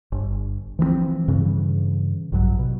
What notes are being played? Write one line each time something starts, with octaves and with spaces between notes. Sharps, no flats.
G1
E3 F3 G#3 C4
G2 C#3 E3
A#1 G2 D3 F#3
B2